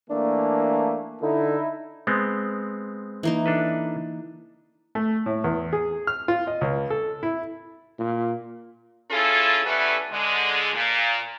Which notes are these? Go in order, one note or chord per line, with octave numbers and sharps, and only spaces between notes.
E3 A3 A#3 D4
D3 D#4 E4
G#3 B3 C4
E3 A#3 D#4
D4 A4 B4
A3
A2
E2
G#4
F6
F4
D#5
C#2
A4
E4
A#2
C#4 E4 F4 G#4 A4
G3 B3 C#4 E4 A4 B4
D3 G#3
A#2